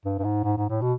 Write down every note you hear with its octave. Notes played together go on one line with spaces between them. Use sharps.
G2
G2
G#2
G#2
G#2
A2
B2